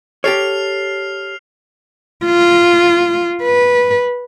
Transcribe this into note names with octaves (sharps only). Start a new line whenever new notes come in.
G4 A4 C#5 F6 C7 F7
F4
B4